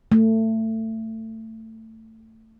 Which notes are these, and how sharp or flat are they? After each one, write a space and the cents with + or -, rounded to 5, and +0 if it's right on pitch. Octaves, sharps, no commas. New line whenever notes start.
A3 +20